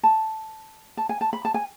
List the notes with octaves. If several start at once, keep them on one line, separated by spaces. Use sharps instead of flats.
A5
A5
G#5
A5
B5
A5
G#5